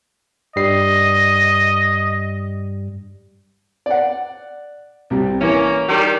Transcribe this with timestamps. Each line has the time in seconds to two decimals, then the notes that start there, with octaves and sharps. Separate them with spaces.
0.56 G2 G3 D#5 C7
3.86 D5 F#5
5.10 C2 C3 G3
5.41 E3 A#3 C#4
5.88 D#3 G3